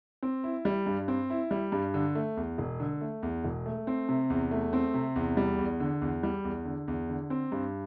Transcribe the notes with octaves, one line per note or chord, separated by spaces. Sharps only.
C4
E4
G3
G2
C4
E4
G3
G2
D3
A3
E2
E1
D3
A3
E2
E1
A3
C4
C3
E2
A3
C4
C3
E2
G3
E2
D3
E2
G3
E2
D3
E2
D3
C4
G2